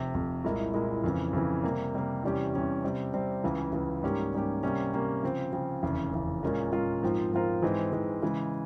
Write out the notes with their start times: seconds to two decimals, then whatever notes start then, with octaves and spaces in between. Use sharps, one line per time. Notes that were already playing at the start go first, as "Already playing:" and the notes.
Already playing: F1 F2 C3
0.14 F1 F2 C3
0.44 C2 A#2 G#3 E4 A#4
0.74 C2 A#2 G#3 E4 A#4
1.04 F2 C#3 E3
1.33 F2 C#3 E3
1.64 C3 G3 A#3
1.94 C3 G3 A#3
2.23 E2 C3 G3 C#4 G4
2.53 E2 C3 G3 C#4 G4
2.83 C3 G3 C4
3.13 C3 G3 C4
3.44 C#2 C#3 E3
3.73 C#2 C#3 E3
4.03 G#2 G3 A#3 C#4 G4
4.33 G#2 G3 A#3 C#4 G4
4.63 C3 G3 A#3 C#4 G4
4.93 C3 G3 A#3 C#4 G4
5.23 C#3 F3 C4
5.53 C#3 F3 C4
5.83 F1 E2 C#3
6.13 F1 E2 C#3
6.43 A#2 G#3 C#4 F4 A#4
6.72 A#2 G#3 C#4 F4 A#4
7.02 G#2 F3 C4 F4 A#4
7.33 G#2 F3 C4 F4 A#4
7.62 G#2 E3 G#3 C4
7.92 G#2 E3 G#3 C4
8.22 C#3 E3 G#3